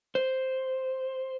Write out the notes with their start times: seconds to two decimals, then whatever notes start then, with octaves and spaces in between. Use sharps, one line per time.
0.15 C5